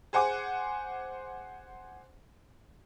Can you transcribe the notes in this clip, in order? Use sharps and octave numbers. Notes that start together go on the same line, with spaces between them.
G#4 C5 F#5 G#5 D6